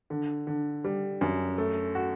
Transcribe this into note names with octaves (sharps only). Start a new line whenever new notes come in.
D3
D3
G3
F#2
A3
F#4